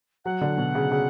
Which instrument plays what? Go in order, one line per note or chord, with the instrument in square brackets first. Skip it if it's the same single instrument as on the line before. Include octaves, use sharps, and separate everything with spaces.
[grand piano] F#3 [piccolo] F#5
[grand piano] D3
B2
C#3
C#3